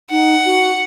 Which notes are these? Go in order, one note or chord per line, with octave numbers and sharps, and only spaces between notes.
D#4 F#5
F#4